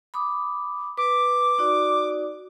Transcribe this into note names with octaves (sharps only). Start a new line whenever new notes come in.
B5 D6 D#6
B4 D6
D#4 F#4 D5